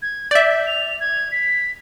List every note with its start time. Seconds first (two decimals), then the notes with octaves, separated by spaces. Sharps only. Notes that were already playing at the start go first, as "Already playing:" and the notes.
0.02 G#6
0.31 D5 E5 G6
0.67 F7
1.00 G#6
1.32 B6